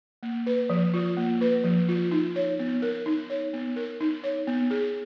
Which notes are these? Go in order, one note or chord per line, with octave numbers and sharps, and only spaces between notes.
A#3
B4
F3
F4
A#3
B4
F3
F4
D#4
C#5
B3
A#4
D#4
C#5
B3
A#4
D#4
C#5
B3
G#4